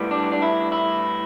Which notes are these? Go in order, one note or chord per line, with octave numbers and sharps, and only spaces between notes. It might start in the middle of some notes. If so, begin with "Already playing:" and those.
Already playing: A2 G3 B3
D4
D4
E4
E4